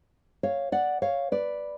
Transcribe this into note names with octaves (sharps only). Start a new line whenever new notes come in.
C#5 F5
D5 F#5
C#5 F5
B4 D5